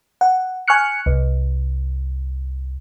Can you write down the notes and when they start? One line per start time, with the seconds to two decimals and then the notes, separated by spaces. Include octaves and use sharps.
0.21 F#5
0.68 G#5 C#6 F6 F#6 C#7
1.06 C2